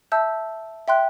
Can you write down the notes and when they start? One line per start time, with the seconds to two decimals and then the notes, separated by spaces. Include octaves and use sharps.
0.12 E5 A5 E6 G6
0.88 E5 G5 C6 F#6